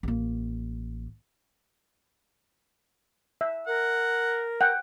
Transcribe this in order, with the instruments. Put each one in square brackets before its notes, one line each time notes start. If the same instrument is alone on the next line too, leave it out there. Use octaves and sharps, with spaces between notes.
[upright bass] A1 A#3
[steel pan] E5
[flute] A#4 [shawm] F#5
[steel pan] F#5 G5